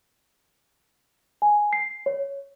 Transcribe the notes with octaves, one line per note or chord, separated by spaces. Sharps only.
G#5
C7
C#5